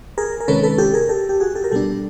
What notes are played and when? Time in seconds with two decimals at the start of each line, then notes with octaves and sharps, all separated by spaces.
0.18 G#4 A#4
0.40 A#4
0.48 C3 D#3 G#3 C#4 A4 B4
0.63 A4 B4
0.78 G4 A4
0.94 G#4 A#4
1.09 G4 A4
1.29 G4
1.40 F#4 G#4
1.55 G4 A4
1.64 A#4
1.71 B2 G3 B3 D4 G4 A4